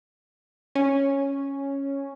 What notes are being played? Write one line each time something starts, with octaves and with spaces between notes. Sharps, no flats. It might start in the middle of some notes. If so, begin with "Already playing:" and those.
C#4